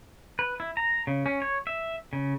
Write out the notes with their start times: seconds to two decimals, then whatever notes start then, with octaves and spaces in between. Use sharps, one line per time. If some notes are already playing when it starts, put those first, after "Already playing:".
0.39 B4
0.60 E4
0.77 A#5
1.07 C#3
1.26 C#4
1.42 C#5
1.67 E5
2.13 C#3